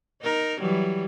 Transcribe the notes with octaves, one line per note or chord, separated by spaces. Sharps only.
D#4 A#4
E3 F#3 G3